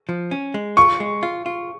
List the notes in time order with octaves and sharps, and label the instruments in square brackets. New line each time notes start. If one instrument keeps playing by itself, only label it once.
[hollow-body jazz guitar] F3
C#4
G#3
[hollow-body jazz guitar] F4 [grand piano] C#6
[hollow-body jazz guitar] G#3
F4
F4